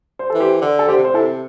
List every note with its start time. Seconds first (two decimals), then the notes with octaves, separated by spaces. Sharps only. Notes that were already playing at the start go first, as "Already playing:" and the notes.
0.19 C5
0.30 E3 A4
0.40 G4 C5
0.62 D3
0.79 A4
0.88 D3 G4 C5
0.97 C3
1.05 C5
1.14 C3 E4 A4